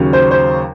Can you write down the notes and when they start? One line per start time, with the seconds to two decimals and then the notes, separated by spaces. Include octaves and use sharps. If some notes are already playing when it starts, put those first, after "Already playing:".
Already playing: D#2 C#3 F#3 C#4
0.13 C5
0.31 C5